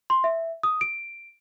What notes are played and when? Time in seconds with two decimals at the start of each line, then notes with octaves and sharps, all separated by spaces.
0.10 C6
0.24 E5
0.63 D#6
0.81 D7